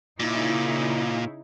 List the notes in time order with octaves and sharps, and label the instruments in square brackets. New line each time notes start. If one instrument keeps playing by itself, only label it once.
[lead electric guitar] A#2 [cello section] C#3 D#4 E4